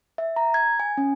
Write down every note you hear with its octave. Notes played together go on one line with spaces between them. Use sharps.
E5
A#5
G#6
G#5
C#4